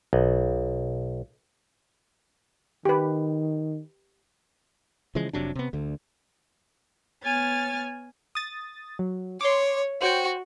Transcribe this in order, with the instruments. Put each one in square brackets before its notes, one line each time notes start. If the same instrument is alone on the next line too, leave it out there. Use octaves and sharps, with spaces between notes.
[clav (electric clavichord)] B1
[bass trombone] D#3 [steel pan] G4 B4
[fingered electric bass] C#3 E3 F3 G#3
F1 C3 F#3 D4
C3 B3
D2 D3
[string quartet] B3 C#5 G#5 F6 A6
[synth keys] D#6 A6
F#3
[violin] C#5 [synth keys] C6 D6
[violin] F#4 [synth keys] C5 C#5 G5